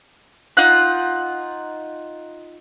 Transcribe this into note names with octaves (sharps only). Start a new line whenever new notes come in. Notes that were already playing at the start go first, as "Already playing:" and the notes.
D#4 F4 F#5 F#6